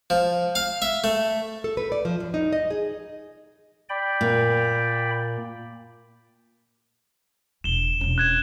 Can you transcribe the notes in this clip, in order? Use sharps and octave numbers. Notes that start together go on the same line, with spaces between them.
F3
F5
E5
A3
A4
B4
D5
F3
F#2
D#4
D#5
G#4
D5 G5 B5
A#2
E1 E7 G7
E1 C#4
F#6 G#6 E7